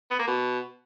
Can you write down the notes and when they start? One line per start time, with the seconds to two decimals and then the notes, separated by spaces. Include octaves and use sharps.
0.11 B3
0.19 A#3
0.27 B2